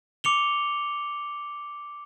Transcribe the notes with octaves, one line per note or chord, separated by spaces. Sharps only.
D6 C#7 F7 G7